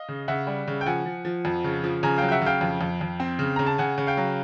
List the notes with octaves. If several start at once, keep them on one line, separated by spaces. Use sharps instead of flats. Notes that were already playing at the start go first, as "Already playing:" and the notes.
Already playing: D#5 F5
C#3
C#3 E5 F#5
G3
C#3
G5
F3 F#5 G#5
F3
F3
F2
C#3
F3
C#3 G#5 A#5
F#3 F5 G5
G5
E5 F#5
C#3 F5 G5
F2
F2
F2
C4
C#3
C#3 A#5
A5
C#3 F#5 G#5
C#3
F5 G5
F#3